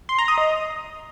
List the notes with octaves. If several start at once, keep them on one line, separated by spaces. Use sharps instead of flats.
C6
A#5
D#6
D#5